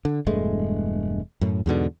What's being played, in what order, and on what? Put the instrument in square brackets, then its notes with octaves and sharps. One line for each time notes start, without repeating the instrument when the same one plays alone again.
[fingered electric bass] D3
E1 G2 G#3 A3
F#2 A2
E2 G#2 B2 D3